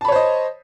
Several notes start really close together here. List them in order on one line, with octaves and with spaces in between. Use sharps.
A5 B5 C#5 C5 D#5